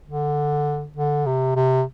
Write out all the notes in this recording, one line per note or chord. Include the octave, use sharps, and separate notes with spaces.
D3
D3
C3
C3